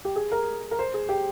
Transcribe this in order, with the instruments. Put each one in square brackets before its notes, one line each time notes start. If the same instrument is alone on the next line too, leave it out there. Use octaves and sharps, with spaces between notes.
[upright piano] G4
G#4
A#4
A#4
C5
G#4
G4